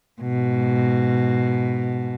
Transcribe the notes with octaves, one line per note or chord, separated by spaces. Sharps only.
G#2 B2